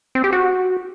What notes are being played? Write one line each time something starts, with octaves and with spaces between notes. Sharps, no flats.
C4
G4
F#4